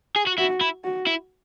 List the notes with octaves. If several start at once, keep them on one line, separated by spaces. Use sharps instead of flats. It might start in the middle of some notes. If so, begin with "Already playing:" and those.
G#4
F#4
E4 F#4
E4
F#4
E4